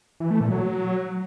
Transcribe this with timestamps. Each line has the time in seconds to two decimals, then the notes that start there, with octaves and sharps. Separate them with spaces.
0.20 E3
0.31 A3
0.41 A#2
0.51 F#3